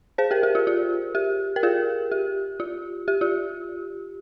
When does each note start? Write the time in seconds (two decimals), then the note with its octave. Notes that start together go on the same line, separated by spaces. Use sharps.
0.18 G#4 C5
0.31 G4 A#4
0.43 G4
0.55 F4
0.67 F4
1.15 G4
1.56 A#4
1.63 F4 G#4
2.11 G4
2.60 F4
3.08 G4
3.21 F4